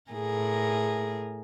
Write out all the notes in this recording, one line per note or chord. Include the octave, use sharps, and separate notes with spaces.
A2 G#4 A#4